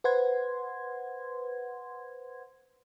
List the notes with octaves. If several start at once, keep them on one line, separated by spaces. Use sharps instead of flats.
B4 C5 F#5 C6 G#6